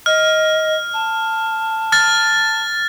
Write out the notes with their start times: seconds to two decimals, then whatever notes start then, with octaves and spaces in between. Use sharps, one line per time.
0.06 D#5 F6
0.93 A5
1.92 F6 A6